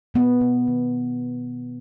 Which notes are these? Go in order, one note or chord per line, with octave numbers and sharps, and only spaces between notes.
B2 B3
B2
D#3